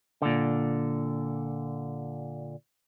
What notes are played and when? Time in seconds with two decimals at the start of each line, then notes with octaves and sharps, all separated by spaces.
0.22 A#2 D3